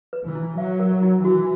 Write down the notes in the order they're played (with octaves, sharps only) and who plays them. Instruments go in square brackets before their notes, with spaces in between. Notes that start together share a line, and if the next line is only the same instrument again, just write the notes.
[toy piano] B4
[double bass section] E3
[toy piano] E4
[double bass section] F#3 [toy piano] E5
[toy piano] A#4
E4
[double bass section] E3 [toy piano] F#4